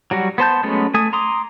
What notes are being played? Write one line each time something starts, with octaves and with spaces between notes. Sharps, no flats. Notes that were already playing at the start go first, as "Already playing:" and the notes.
F#3 G3 F#4
B3 C5 A5 G6
F#3 G#3 A3 B3 C#4
A3 G#5 D#6
A#5 C6 D6 D#6